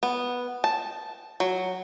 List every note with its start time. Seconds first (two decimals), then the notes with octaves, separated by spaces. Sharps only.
0.03 B3
0.64 A5
1.40 F#3